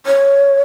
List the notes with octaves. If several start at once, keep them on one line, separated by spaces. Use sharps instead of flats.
C#5